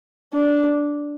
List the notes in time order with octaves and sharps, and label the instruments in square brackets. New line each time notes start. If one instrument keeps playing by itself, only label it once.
[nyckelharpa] D4